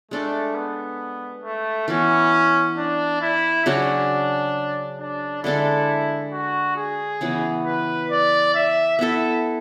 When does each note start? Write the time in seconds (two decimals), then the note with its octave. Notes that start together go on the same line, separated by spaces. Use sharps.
0.11 G#3 A3 D4 A4
0.55 B3
1.44 A3
1.88 E3 B3 C#4 F#4
2.77 D4
3.21 E4
3.66 C#3 F#3 C#4 D4 F#4
5.00 D4
5.44 D3 G#3 D4 E4 A4
6.32 F#4
6.76 G#4
7.21 C#3 E3 B3 F#4
7.65 B4
8.10 D5
8.55 E5
8.99 B3 E4 A4 E5